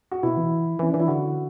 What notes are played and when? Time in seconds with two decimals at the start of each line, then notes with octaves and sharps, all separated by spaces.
0.12 F#4
0.23 B2 E4
0.37 E3
0.79 E3 C#4
0.91 E3 D4
1.00 E4
1.08 D3 F#4